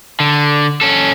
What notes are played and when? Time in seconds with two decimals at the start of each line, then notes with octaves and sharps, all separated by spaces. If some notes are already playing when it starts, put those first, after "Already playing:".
0.20 D3
0.81 C#4 A4